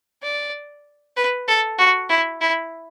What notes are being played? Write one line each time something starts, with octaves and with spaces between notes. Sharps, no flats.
D5
B4
A4
F#4
E4
E4